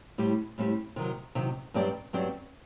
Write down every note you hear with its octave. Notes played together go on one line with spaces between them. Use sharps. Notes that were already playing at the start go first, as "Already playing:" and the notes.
A2 G3 C4 G4
A2 G3 C4 G4
C3 D#3 F#3
C3 D#3 F#3
G2 F#3 C4 G4 D5
G2 F#3 C4 G4 D5